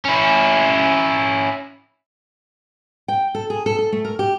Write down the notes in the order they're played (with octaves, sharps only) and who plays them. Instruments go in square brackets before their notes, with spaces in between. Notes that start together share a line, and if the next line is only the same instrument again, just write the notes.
[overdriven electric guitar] C#4 E4
[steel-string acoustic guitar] G5
A4
G#4
A4
A4
A3
A#4
G4